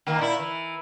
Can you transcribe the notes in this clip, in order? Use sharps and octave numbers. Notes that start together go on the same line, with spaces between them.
D#3 A#3
A#2 E4
E3